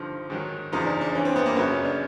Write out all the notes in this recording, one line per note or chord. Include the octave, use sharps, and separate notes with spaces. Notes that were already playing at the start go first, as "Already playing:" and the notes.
Already playing: G2 D3 F3 D#4
G#2 D#3 F#3
E2 C#3 F3 D#4
D4
D4
G2 E3 C#4
C4
B3
A#3
F#2 C#3 F#3 B3
C#4
D4